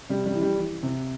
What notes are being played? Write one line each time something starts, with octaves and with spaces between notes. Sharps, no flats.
C3 G3
G3
E3
G3
E3
C3